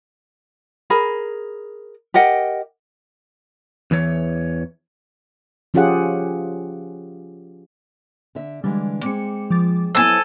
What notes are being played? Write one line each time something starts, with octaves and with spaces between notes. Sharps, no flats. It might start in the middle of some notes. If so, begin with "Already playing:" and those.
G#4 A#4 B5
G4 A#4 D#5 F#5
E2 E3 C#5
F3 C#4 F4 G4 G#4 F#5
D3 E5
D3 E3 G3 G#3
G#3 C4 G#4 D6 C#7
F3 D6 A6
F#3 B3 E4 A4 C5 G#5